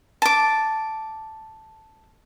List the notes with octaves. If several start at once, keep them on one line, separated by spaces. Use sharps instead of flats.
A5 D6